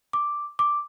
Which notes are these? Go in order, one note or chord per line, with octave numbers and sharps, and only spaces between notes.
D6
D6